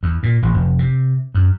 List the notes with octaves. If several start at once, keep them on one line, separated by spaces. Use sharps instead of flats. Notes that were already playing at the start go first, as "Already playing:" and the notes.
E2
A#2
A1
F1
C3
F#2